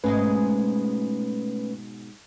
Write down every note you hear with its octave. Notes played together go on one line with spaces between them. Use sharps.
G#2 B2 G#3 A3 C#4 B4